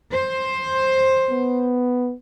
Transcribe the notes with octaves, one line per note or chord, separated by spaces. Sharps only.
C5
B3